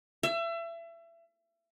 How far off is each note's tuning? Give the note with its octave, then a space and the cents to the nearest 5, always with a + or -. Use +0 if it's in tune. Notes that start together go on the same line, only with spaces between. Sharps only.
E5 +30